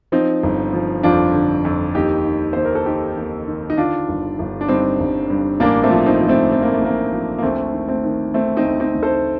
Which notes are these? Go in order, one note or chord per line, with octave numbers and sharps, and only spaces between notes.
F3 C4 D#4
G1
F3
F2 D4 F4
D3
F2
D#2 D#4 G4
D#3
D#2 C5
A#4
A4
D#3 D#4 G4
D#2
D#3
D#4
D3 D4 F4
G1
G1
D4
G2 C4 D#4
G1
G2
A1 A#3 D4
A3 C4
F3
C4 D#4
F3
A3 C4
F3 C4
A#3
A3
A1 A#3
F3
A#3
D2 A3 C4
D#3
A3 C4
D#3
D#3 A3 C4
C4 D#4
D2
C4 D#4
D2
A4 C5